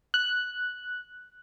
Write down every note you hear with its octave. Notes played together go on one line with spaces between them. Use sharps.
F#6